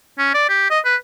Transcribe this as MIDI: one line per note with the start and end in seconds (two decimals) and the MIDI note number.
0.18 0.32 61
0.34 0.45 74
0.49 0.68 67
0.70 0.80 75
0.85 0.96 71